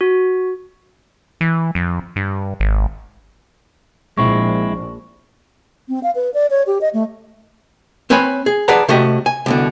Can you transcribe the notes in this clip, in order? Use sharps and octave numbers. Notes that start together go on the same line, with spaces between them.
F#4
E3
F2
G2
G#1
A#1 G#3 C4 E4 C#6
C4
F5
B4
D5
C#5
G4
D#5
A3
C4 B4 C#5 G#5 B5
G#4
G#4 B4 D5 F#5 A5 A#5
C3 A3 F#4 G4 D#5
G#5
C2 B2 D3